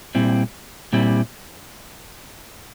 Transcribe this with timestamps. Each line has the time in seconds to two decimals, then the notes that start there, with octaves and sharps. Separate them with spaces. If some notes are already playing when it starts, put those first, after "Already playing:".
0.15 A#2 G3 C4 E4
0.93 A#2 G3 C4 E4